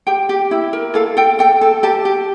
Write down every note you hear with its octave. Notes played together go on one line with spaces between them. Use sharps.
G4 G5
G4
E4
A#4
A4 F5
A4 G5
A4 G5
A4
G4 A5
G4